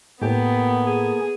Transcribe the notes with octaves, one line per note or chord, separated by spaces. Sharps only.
A2 A#3 B3 G4 A4 G#5
G#4